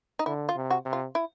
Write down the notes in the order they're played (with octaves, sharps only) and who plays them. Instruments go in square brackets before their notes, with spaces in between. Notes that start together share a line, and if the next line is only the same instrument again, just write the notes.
[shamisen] D#4
[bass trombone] D3 [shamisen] E4
[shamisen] F4
[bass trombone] C3
[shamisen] F#4
[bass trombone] C3
[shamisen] F4
E4